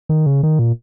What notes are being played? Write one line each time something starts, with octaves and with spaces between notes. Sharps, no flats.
D#3
C#3
D#3
A#2